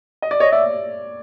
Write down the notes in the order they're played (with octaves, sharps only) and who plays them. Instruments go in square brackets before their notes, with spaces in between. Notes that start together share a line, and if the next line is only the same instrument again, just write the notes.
[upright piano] D#5
D5
[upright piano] C#5 [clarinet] D#5
[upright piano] D5 [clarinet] E5